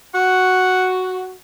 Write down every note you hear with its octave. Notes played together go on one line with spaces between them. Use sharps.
F#4 F#5